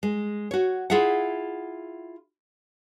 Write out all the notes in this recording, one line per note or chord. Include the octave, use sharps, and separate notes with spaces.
G#3
F#4 C#5
E4 F4 G#4 E5 F#5